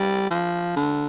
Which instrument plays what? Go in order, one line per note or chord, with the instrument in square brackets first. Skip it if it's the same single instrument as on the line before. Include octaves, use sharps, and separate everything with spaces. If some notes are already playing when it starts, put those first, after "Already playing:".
Already playing: [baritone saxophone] G3
F3
D3